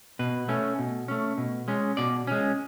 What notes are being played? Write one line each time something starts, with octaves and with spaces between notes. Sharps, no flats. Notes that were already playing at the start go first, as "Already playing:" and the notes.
B2 B4
A3 C#4
B2
A3 C#4
B2
G#3 C#4
B2 D5
G#3 C#4